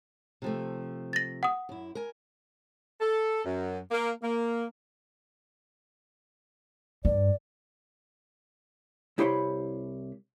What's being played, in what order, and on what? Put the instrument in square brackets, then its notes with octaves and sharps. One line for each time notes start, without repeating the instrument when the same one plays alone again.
[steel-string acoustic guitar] C3 F3 A3
[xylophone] A6 A#6
F#5 D#6
[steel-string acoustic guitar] F#2 E4
A#4 G#5
[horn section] A4
F#2
A#3
A#3
[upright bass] G2 [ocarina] D5
[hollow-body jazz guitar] C2 E4 G4 C5 C#5 B5